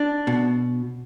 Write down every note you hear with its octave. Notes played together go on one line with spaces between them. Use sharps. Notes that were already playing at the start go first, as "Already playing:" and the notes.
Already playing: D4
B2